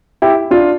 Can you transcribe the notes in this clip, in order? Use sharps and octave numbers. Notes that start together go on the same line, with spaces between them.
E4 G4
D4 F4